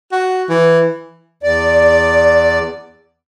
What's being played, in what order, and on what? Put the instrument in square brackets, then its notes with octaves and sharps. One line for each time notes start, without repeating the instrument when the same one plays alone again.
[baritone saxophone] F#4
E3
[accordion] E2 D5